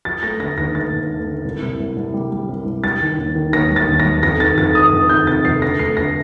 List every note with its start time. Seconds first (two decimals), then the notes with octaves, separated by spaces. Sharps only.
0.05 F3 A6
0.23 A3 A#6
0.40 D3 A#6
0.57 D#2 A#6
0.75 A3 A6
0.93 D#2
1.10 A3
1.27 D3
1.45 C2
1.62 C2
1.80 C2
1.97 C2
2.14 G3
2.32 G3
2.49 C2
2.66 C2
2.84 G3 A6
3.02 D#3
3.18 D#2
3.36 D#3
3.53 D#2 A#6
3.71 G3
3.76 A6
3.88 D#2
4.00 A#6
4.05 G3
4.23 F2 A#6
4.40 D#3 A6
4.58 F2 A6
4.75 D#3 D#6
4.93 F2
5.09 D#3 G6
5.27 C3 A6
5.45 F2 C7
5.62 D2 A#6
5.79 A3 C7
5.97 D3 A#6